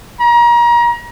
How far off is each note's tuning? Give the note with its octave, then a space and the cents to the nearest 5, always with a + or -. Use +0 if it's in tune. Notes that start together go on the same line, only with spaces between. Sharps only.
A#5 +30